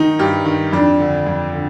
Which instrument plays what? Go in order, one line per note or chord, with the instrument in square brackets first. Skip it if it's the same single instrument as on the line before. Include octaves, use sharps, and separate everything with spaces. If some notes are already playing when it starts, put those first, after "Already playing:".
Already playing: [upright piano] D#3 D#4
G2 G4
D#3
F2 D4
D3
F2
D3